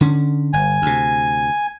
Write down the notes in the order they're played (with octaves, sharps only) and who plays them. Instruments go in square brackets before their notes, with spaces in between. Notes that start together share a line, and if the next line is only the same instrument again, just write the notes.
[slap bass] D3 C#4
[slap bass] G1 [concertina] G#5
[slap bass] D2 C3